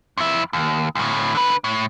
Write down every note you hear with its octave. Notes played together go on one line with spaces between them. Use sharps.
F2 E4
D#2
D2 A2
D3 B4
A2